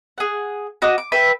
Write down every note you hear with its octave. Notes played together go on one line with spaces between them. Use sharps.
G#4 F#5
F#4 D#5 D6 F#6
D6
B4 E5 G5